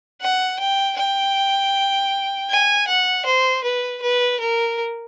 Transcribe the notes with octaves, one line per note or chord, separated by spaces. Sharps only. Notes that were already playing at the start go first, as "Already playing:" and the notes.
F#5
G5
G5
G#5
F#5
C5
B4
B4
A#4